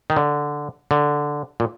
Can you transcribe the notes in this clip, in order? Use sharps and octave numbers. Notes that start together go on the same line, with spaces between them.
D#3
D3
D3
A#2